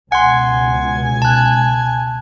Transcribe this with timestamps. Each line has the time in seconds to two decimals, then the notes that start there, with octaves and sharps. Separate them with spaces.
0.12 C#2 B2 F#5 G#5 C6
1.22 A5 F#6